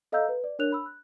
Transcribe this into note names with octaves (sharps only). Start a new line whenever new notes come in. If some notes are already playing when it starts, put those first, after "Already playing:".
A4 D#5 F5 A#5 E6 G6
B4
D5
D4 A#4 C#5 F#6 F7
B5 E6
F#6